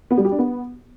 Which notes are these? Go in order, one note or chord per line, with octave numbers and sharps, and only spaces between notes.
B3
G3
G4
D4
B3